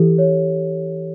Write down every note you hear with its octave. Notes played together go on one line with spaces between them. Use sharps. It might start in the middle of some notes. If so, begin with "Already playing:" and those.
Already playing: E3 G4 A4
C#5